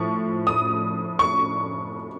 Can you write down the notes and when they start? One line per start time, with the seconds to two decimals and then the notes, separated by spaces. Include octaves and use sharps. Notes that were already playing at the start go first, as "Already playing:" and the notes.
Already playing: A2 F3 C#6
0.47 D#6
1.19 C#6